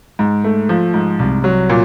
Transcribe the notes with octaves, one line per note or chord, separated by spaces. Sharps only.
G#2
A3
F3
G#2
C2
F#3
A#2